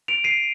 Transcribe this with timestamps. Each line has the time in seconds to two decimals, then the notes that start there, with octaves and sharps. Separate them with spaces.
0.08 D7 F7
0.24 C7 D#7